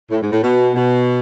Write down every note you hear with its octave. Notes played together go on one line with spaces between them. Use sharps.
A2
G#2
A2
B2
B2